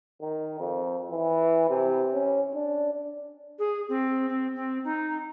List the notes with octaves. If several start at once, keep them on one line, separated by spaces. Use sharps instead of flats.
D#3
F2
E3
C3
C#4
D4
G#4
C4
C4
C4
D#4